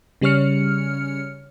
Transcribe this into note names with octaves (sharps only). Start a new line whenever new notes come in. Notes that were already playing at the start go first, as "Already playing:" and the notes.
C#3 G3 C#4 C#5 F6 C#7